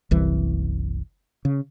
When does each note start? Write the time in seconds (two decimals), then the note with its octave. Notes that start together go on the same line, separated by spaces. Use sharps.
0.11 F#1 C2 E3
1.45 C#3